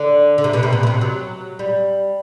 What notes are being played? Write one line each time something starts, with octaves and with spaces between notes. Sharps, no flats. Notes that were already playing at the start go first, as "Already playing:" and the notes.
Already playing: D3
D3
C3
B2
C3
B2
B2
C3
F#3
G3